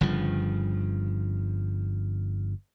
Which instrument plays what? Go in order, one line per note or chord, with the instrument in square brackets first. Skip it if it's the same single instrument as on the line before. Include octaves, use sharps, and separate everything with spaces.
[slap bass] G1 G2 C#3 F3